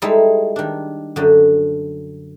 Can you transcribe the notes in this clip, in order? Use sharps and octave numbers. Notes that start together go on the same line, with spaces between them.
G3 G#3 D#4 E4 A4
D#3 D4
F#2 D3